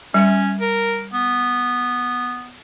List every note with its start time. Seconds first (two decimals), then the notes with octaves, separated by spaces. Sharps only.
0.14 G3 C#4 E5
0.60 A#4
1.13 B3